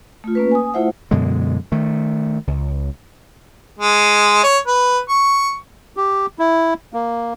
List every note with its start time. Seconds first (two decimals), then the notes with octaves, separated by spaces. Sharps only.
0.24 A3 F4
0.35 A#3 C#4 B4
0.51 G#5 D#6
0.74 A3 E4 F4 C5 E5 F#5
1.11 F#2 B2 D3 G#3
1.72 D#3 A3
2.47 C#2
3.79 G#3
4.44 C#5
4.67 B4
5.09 C#6
5.97 G4
6.39 E4
6.93 A#3